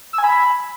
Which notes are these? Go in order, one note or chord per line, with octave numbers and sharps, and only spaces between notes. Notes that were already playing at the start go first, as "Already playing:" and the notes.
E6
G#5
B5